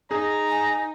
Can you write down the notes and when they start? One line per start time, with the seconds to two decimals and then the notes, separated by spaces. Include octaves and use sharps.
0.11 D#4 G#4 A#5
0.48 G#5